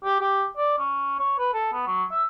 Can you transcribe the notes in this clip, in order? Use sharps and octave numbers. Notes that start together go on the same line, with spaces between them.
G4
G4
D5
C#4
C#5
B4
A4
B3
F#3
E5